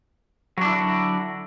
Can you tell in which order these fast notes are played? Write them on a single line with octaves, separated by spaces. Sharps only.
F#3 D4 E4 D3 F#4